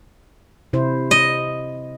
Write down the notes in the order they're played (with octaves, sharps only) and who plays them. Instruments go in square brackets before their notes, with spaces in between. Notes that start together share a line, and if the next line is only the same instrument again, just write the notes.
[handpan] C3 E4 C5
[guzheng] D#5